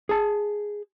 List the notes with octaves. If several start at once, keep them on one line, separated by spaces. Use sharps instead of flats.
G#4 A5